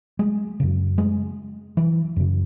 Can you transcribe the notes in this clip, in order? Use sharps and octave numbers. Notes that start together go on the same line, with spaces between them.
G#3
F#2 C#3
G#3
E3
F#2 C#3